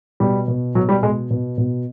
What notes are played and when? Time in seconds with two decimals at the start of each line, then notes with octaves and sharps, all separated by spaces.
0.20 B2 G3
0.48 B2
0.75 B2 F#3
0.89 G3
1.03 B2 G#3
1.31 B2
1.58 B2